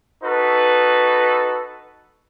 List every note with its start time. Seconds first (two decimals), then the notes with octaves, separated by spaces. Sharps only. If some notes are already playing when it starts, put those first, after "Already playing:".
0.23 D#4 F#4 A4 B4